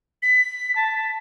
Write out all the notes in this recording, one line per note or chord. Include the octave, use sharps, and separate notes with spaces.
B6
A5